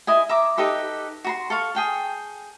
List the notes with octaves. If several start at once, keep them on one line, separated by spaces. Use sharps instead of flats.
E4 D#5 G#5
E5 A#5 D6
D#4 G4 A4 B4
F#4 A#5 C6
A4 F5 C#6
G#4 G5 A5